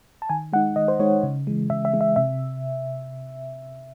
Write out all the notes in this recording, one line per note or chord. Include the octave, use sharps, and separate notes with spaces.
A5
D#3 G#5
G#3 D#4 F#5
D#3 D#5
C5
G#3 D#4 C#5
C#3
E3 G#3
C#3 E5
E5
E3 G#3
E5
C3 E5